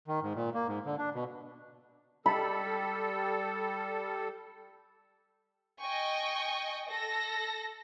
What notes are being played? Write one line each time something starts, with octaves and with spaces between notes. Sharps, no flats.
D#3
G#2
A#2
A#3
G#2
D3
D4
B2
G3 A4 B5
D#5 G5 G#5 C#6
A4 A#6